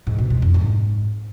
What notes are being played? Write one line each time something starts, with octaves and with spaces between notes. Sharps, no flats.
G#2
B2
G#3
F2
G#2